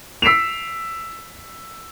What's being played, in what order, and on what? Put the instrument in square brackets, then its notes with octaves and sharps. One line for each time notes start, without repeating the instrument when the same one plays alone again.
[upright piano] E6 B6 C7 D7 E7 F7